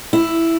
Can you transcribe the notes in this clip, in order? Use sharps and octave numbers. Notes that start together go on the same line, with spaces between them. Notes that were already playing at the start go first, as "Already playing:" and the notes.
E4